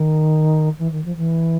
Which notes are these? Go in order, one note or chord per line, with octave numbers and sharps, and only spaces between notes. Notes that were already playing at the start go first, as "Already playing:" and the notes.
Already playing: D#3
E3
D#3
F3
E3